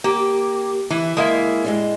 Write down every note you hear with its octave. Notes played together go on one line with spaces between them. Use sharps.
A#3 G4
E3 E4
G#3 A#3 E5
A2 G#3 D4